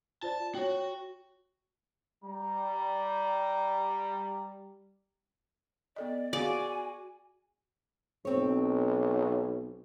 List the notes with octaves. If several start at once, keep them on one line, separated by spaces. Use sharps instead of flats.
F4 C5 D5 A5
F#4 C#5 G5
G3 A#5
B3 A4 D5 D#5
F#4 G#4 D5 F5 G#5
B1 C4 C#5